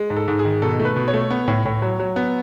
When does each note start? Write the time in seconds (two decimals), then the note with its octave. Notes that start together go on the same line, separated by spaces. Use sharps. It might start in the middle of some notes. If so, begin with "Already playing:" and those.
Already playing: G#3
0.10 G#2
0.16 A4
0.28 G#2
0.39 G#4
0.45 D#3
0.62 B2 A4
0.80 A3
0.85 B4
0.96 B2
1.08 C#5
1.14 A3
1.30 B3
1.48 A2
1.65 A2
1.82 F#3
2.00 F#3
2.16 B3